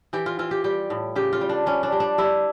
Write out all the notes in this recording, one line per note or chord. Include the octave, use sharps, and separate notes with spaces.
E3 G4
F4
E3 F4
G4
G3 G4
A2
C#3 G4
F4
G3
D4
G3 C#4
D4
G3
D4
G3 E4